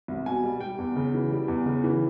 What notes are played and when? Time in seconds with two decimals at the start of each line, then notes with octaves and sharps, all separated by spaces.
0.08 C2
0.26 B2 G#5
0.44 G3
0.60 G3 G5
0.78 E2
0.96 C#3
1.14 E3
1.31 G3
1.48 E2
1.66 C#3
1.84 E3